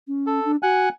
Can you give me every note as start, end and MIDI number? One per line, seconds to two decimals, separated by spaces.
0.07 0.40 61
0.27 0.52 69
0.45 0.56 62
0.63 0.87 66
0.63 0.89 78
0.63 0.89 80
0.63 0.89 90